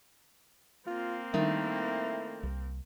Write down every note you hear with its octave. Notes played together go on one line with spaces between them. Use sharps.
A#3 C4 F4
D#3 G3 A3 E4
C2